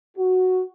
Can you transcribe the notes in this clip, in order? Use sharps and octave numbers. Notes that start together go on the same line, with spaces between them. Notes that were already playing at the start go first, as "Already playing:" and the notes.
F#4